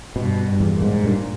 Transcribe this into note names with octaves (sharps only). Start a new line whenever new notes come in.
G2 B2
G2
E2
A#2
G#2
G2 A#2